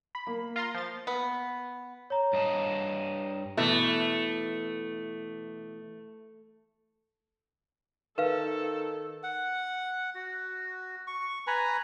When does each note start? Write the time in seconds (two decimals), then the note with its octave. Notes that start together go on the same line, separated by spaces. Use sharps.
0.15 B5
0.27 A#3
0.56 F4 A#5 C6
0.74 F3 A6
1.07 B3
2.10 C#5 A#5
2.33 G2 D#5 A5
3.57 B2 E3 A3 E5
8.18 D#3 A4 B4 F5
9.23 F#5
10.15 F#4
11.07 C#6
11.47 B4 G#5 A#5 B5